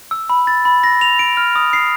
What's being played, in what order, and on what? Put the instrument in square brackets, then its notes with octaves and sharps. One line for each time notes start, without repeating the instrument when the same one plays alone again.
[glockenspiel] E6
B5
A6
B5
A#6
F7
D7
F6
D#6
C7